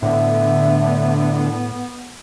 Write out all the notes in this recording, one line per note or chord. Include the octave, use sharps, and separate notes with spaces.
A2 D3 B3 E5